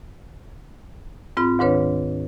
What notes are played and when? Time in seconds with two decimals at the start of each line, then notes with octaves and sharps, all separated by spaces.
1.37 G#2 C4 F4 B5
1.59 D2 G#2 D#3 D4 B4 C#5